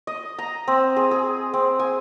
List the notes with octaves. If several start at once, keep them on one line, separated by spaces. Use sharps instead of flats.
D#5
A#5
C4
G#4
G#4
C4
G#5